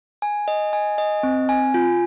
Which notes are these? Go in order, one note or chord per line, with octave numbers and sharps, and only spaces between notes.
G#5
D#5
G#5
D#5
C4
G#5
F4